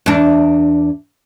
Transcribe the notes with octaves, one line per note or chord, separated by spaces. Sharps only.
E2 D4